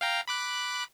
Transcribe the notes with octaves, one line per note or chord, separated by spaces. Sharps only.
F5 G5 A#5
B5 D6 F#6